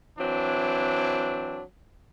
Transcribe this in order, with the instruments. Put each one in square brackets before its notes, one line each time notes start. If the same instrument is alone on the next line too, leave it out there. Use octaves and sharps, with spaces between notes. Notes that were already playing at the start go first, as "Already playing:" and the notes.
[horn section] E3 F#3 C4 D4